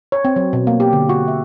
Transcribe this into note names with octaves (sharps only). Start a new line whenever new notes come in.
C#5
C4
F#3
B2
A#3
G4
D3
F#4
E5